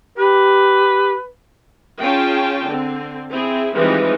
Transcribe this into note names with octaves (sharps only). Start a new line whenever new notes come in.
G4 B4
C#4 F4 G#4 G5 A5
D3 C4
C4 E4 G#4
E3 F3 G3 G#3 C4 D#4